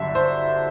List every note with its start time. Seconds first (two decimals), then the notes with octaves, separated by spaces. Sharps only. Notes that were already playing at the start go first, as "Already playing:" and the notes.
Already playing: G1 G2 D3 F#3 E5
0.15 C5